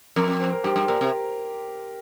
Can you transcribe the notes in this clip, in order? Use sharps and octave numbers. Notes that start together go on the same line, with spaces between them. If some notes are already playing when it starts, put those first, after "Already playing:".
F2 A#4
A#4
C5
A#4
G2 G4
G2
A#2 A#4
C3